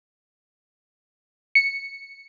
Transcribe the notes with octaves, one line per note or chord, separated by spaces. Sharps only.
C#7